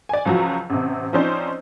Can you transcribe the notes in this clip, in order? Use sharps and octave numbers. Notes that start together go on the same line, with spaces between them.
D5 G#5
C#2 F3 F#3 F#4
A1 C3
F3 C4 C#4 D#4 C5 D5